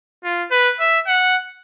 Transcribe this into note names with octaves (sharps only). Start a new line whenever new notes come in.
F4
B4
E5
F#5